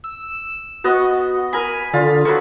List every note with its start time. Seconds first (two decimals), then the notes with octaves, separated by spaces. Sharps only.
0.04 E6
0.84 B3 F#4 D#5
1.53 A#4 G#5 B5
1.93 D3 F4
2.25 F#3 A4 B4 C#6